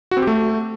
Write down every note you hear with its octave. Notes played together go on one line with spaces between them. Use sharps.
F#4
C4
G4
A3